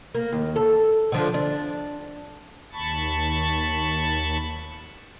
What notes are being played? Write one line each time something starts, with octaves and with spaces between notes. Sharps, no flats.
A#3
D#2
A4
D3 F3 D4
D4
D#2 A5 B5 C#6 A6